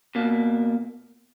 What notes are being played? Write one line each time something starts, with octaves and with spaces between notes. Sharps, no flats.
B2 A#3